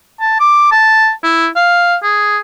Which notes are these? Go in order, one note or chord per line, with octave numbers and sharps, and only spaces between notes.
A5
D6
A5
E4
F5
G#4